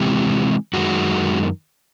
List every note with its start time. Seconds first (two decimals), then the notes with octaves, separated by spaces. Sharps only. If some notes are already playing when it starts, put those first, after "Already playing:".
Already playing: C3 E3 G#3 C4 G4
0.73 F#2 D#3 G#3 F#4